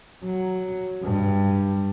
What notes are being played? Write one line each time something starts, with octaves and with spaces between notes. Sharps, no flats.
F#3
G2